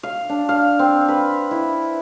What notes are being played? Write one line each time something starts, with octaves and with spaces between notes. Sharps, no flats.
F5
D4
F5
C4
B4
E4